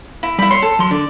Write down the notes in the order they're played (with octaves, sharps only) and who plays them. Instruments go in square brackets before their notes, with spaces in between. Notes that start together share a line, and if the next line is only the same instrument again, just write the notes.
[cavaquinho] E4
[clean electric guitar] G3 [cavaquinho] E4 B5
[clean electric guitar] C#5 [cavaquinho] C6
[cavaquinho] A4
[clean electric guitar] F#3 C6
[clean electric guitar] D3 [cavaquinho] D5